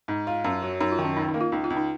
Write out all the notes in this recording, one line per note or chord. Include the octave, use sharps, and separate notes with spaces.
G#2 D#4
F4
F#2 C#4
F#3
F#2 D#4
F4
D#3
C#4
C#2 D#4
D#4
A#3
F4
C#2 D#4
F4
C#2
D#4